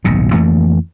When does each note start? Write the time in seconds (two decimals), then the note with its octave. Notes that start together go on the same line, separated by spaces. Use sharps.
0.04 D#1 B1 G#2 B2
0.33 F2 E3 A3 A#3